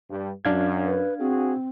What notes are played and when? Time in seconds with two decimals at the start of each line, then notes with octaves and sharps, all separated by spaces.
0.10 G2
0.45 F#2 D4 F5 G#6
0.86 B4
1.20 C4 F#4 G#4